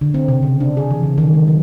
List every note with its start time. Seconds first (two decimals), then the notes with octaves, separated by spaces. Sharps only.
0.01 D3
0.14 C4
0.28 C3
0.43 C#3
0.60 D4
0.77 G#4
0.91 E3
1.03 C#3
1.18 D#3
1.34 G#3
1.47 F#3